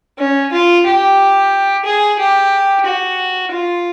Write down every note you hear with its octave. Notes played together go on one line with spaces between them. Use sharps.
C#4
F4
G4
G#4
G4
F#4
F4